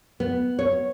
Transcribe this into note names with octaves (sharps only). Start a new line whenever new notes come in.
B3
C#5